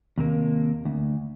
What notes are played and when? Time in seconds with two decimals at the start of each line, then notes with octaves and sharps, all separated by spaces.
0.18 D#2 C3 A#3
0.85 D2